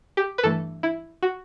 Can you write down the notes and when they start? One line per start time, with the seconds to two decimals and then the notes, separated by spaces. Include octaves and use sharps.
0.17 G4
0.38 B4
0.43 G2 E3 A3 A4
0.83 E4
1.23 F#4